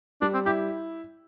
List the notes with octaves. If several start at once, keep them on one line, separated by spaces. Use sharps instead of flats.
G3 D4
C4
E4 G4